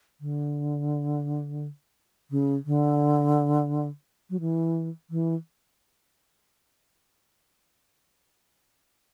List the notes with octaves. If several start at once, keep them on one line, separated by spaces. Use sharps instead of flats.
D3
C#3
D3
F#3
E3
E3